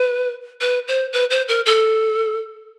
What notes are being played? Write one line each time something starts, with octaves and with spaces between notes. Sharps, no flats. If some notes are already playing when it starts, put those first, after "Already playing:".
Already playing: B4
B4
C5
B4
C5
A#4
A4